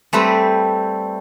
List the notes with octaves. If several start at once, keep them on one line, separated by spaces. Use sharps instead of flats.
G3 A3 C4 B4